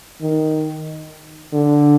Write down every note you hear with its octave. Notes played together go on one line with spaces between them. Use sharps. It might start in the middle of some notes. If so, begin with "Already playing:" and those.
D#3
D3